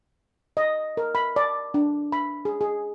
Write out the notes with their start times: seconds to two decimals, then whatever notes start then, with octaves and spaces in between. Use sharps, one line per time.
0.57 D#5
0.97 A#4
1.15 B5
1.36 D5
1.74 D4
2.12 B5
2.45 G#4
2.61 G#4